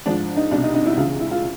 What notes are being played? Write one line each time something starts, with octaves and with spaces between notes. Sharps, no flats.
G#2 F3 D4
D#4
C2 B2 D4
D#4
D#4
E4
C#2 C#3 E3 F4
E4
F4